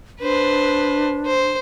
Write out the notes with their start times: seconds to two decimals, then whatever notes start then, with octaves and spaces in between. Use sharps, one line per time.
0.21 D4 B4 C5
1.26 C5